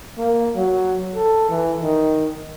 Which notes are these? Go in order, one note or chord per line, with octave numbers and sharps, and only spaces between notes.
A#3
F#3
A4
E3
D#3